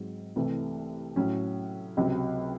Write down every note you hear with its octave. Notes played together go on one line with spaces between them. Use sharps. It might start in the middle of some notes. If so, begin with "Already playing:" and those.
Already playing: G#2 F#3 C4
C2 C3 E3 A3
A2 F#3 C#4
C#2 C3 F#3